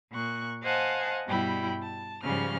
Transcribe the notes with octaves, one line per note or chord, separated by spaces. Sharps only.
A#2 C#6 F#6
C5 D#5 F5 F#5 G#5 A5
G2 B2 G3 E4 G5 B5
A5
G#2 C#3 F3 G3 C#4 F6